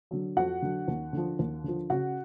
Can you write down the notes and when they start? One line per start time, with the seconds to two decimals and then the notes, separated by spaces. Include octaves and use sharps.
0.11 D3 F#3
0.36 F2 F#4 F#5
0.62 D3 F#3
0.88 D#2
1.13 D3 F3
1.39 D#2
1.64 D3 F3
1.90 C#3 F#4 F#5